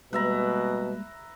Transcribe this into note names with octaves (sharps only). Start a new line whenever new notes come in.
B2 G3 G#3 A#3 B4 E5 A#5